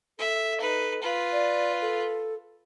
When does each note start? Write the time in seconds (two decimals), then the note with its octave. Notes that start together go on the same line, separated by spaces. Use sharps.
0.19 A4 E5
0.60 D#4 B4
1.01 F4 B4
1.32 D5
1.81 A4